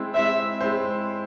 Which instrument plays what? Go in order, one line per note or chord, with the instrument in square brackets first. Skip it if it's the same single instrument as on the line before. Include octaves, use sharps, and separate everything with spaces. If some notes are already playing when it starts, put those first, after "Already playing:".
Already playing: [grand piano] G#3 C4 E4 C5
[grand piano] G#3 C4 E4 C5 [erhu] E5
[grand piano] G#3 C4 E4 C5